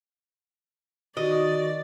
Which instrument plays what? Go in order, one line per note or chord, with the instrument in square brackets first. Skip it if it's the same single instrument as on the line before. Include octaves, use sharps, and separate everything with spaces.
[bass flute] D#3 [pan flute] F#4 [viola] D5 [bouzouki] D#5